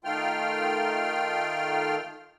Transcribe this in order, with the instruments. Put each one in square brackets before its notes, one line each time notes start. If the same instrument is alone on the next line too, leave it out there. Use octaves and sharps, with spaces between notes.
[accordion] D#3 A3 F4 G5 C6 F6